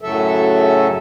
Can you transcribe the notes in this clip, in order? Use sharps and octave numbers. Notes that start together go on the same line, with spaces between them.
F#2 A2 C#3 F#3 A4 E5